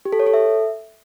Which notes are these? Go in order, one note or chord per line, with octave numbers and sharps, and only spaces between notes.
G4
A4
C#5
A4
E5